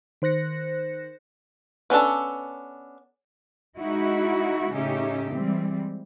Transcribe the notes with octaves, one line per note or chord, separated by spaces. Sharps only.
D#3 C5 F#6 A#6 C#7
B3 C#4 D4 A4
G#3 D#4 E4 F#4
A2 C#3 C#4 D#4 G4 E5
E3 G3 G#3 C4